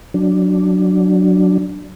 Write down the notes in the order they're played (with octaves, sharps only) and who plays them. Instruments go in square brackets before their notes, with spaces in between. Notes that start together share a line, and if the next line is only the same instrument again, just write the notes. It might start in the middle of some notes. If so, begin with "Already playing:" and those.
[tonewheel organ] F#3 D4